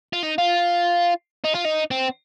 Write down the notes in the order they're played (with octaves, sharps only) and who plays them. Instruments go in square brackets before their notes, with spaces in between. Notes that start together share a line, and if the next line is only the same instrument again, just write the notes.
[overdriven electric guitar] F4
D#4
F4
D#4
F4
D#4
C4